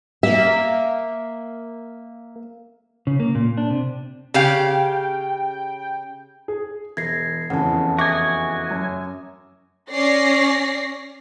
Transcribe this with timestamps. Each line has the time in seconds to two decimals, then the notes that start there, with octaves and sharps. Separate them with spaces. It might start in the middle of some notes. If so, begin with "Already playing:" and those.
0.23 A#3 E5
3.07 C#3
3.20 A#3
3.35 A#2
3.57 D4
3.70 C3
4.34 C#3 G4 F5 G5
6.48 G#4
6.97 E1 G#6 A#6 C7
7.50 F1 E2 C#3 F#5 A5
7.99 F#4 E5 G#5 D6 D#6
8.71 F#2
9.91 C#4 C#5 D5 A#6 C7